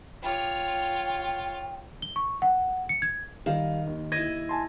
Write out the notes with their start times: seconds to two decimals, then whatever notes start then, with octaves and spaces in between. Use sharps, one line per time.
0.23 F4 C#5 G5
2.02 G7
2.16 C#6
2.42 F#5
2.89 C#7
3.02 G#6
3.46 D#3 G3 F5
3.87 D#2
4.12 E4 D#5 G#6 A#6 D#7
4.49 G#5 A5 C6